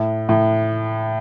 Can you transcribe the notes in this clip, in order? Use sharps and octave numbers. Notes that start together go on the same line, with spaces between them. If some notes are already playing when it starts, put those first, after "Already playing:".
Already playing: A2
A2